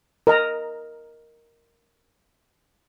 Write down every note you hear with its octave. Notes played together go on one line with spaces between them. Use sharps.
A#4 D#5 A#5